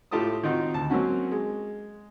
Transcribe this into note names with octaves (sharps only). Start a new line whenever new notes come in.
A2 A3 F4 G4 A5 D#6
D#3 C4 D#4 F4 F#4
D2 A5
F#3 A#3 C4 C#4 F#4
G#3